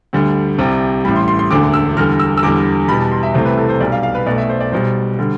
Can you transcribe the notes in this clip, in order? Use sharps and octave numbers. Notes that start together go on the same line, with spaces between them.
D2 D3 G3
C2 C3 G3
A1 A2 G3 B5
C6
C6
C6
E1 D2 D3 D6
E6
E2 D3 G3 F6
E6
E6
E2 D3 G3 D6
E2 B2 G3 B5
A5
C6
E5
C2 C3 E3 A3 C5
B4
A4
C5
B1 B2 G3 D5
F5
F5
B4
B1 B2 A3 D5
E5
C5
D5
B1 B2 G3 C5
D3 G3